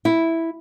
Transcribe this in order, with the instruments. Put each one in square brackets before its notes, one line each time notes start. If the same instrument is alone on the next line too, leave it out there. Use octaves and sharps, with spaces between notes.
[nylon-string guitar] E4